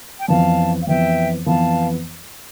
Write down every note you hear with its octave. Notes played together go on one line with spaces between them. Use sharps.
G5
F2 E3 B3 F5 A5
F5
F2 E3 B3 E5 G5
F2 E3 B3 F5 A5